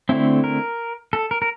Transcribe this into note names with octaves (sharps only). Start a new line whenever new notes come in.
D3 A3 C4 E4
A#4
A4
A#4
A#4